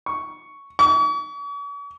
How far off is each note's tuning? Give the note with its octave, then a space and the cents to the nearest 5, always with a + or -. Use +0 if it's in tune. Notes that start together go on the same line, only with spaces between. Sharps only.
C#6 +5
C#6 +45